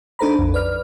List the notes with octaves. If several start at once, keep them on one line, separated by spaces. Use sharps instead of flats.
D4 D#4 A4 C5 A#5 B5
A#1 F2
B4 D5 F6